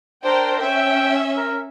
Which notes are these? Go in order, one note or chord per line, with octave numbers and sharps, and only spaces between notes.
D4 A#4 C5 G5
C#4 E5 G5
A#4